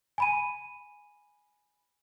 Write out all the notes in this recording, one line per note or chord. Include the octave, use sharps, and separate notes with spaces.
G#5 B5 D#7